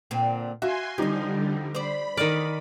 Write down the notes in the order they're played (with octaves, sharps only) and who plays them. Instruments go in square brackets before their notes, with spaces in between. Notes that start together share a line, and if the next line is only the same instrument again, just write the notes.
[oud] A#2 D3 C4
[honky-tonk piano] F#4 F5 [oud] E5 [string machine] G#5 C6
[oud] E2 F3 [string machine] D3 G3 [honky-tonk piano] D#4 G4
[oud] C5 D5 [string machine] B5
[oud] E2 D#4 [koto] D#3 D5 [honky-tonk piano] F6